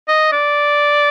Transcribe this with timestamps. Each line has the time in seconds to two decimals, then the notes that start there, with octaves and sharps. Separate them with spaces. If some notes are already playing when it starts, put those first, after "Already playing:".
0.08 D#5
0.32 D5